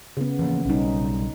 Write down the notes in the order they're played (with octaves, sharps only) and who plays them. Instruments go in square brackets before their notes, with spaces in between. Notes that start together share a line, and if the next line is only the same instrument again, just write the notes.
[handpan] C#3 B3
[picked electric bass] E3 F3 A#3
[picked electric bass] B1 G3 [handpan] C#4 D#4